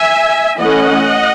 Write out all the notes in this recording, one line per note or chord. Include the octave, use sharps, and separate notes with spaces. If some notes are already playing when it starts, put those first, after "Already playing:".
Already playing: E5 G#5
E3 A3 C#4 D#5 F#5